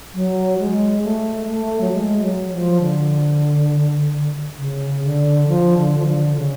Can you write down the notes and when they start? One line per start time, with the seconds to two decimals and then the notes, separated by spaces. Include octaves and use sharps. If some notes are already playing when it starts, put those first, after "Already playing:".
0.14 F#3
0.59 G#3
1.03 A3
1.48 A3
1.81 F#3
1.92 G#3
2.22 F#3
2.52 F3
2.81 D3
4.58 C#3
5.04 D3
5.48 F3
5.78 D3
5.98 F3
6.07 D3
6.36 C#3